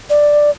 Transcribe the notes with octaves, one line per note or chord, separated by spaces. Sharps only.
D5